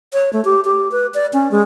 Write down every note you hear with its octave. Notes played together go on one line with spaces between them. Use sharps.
C#5
A3
G4
G4
B4
D5
C#4
G#3